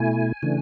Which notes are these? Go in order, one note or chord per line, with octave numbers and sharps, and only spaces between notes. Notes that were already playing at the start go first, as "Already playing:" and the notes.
Already playing: B2 A3 E4 G#5
C#3 E3 A3 D4